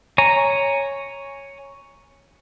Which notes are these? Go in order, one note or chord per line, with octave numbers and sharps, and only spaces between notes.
C#5 G#5 A#5